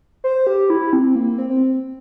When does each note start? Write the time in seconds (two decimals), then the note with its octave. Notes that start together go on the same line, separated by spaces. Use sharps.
0.24 C5
0.47 G4
0.70 E4
0.93 C4
1.15 A#3
1.38 C4
1.50 C4